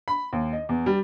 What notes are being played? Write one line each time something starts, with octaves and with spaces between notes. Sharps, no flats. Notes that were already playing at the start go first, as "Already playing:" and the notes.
B5
D#2
D#5
E2
G3